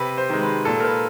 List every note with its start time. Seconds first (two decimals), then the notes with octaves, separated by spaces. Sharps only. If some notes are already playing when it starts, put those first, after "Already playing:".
Already playing: C3 B4
0.18 C5
0.30 D#3 G#3
0.42 B4
0.65 A#2 A4
0.80 A#4
0.84 B4